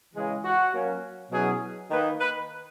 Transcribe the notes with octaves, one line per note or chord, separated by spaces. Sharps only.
C#3 E3 G#3
F#4
F#3 A#3 C#4
B2 F#3 C#4 E4 G#4
D#3 A#3 D#4 B4
B4